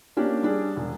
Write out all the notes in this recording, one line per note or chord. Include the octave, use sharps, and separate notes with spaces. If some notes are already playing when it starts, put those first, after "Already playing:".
A#3 C#4 D4 G4
G3 D4 G#4
E1